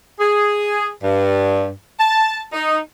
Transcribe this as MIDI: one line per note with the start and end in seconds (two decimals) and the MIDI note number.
0.20 0.88 68
1.03 1.69 43
1.99 2.42 81
2.53 2.77 63